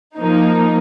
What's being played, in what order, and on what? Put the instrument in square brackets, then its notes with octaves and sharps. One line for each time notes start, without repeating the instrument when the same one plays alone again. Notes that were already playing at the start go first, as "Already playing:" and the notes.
[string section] F3 A#3 D#4